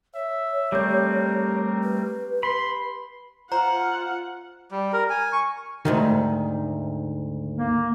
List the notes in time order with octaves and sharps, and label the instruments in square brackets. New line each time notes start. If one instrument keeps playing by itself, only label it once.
[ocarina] C#5 [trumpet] E5
[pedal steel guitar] G3 A3 C4 [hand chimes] G4 D6 G6 [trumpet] A#4
[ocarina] B4
[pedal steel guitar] B5 [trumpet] C6
[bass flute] F4 [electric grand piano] C5 [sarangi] F#5 [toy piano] A#5
[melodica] G3
A#4
G#5
C#6
[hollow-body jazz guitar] D2 G#2 D#3
[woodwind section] A#3